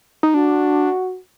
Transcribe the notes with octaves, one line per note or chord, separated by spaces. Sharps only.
D#4
D4 F#4